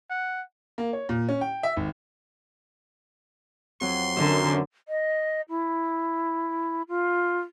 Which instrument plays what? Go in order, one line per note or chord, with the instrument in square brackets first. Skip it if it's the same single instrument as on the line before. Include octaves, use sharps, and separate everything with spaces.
[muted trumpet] F#5
[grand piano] A#3
C#5
A#2
C#4
G5
E5
G#1
[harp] F2 F#3 [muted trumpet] C6
[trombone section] F#2 [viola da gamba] D3
[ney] D#5
E4
F4